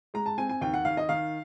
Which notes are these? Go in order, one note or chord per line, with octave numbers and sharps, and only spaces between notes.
G#3 A#5
A5
C4 G#5
G#5
D#2 G5
F#5
D#2 F5
D#5
D#3 F5